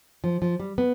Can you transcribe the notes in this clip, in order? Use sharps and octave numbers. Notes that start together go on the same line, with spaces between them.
F3
F3
G3
B3